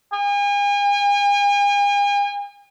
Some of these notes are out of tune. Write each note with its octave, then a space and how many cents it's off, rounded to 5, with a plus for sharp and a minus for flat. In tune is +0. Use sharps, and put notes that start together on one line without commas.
G#5 -40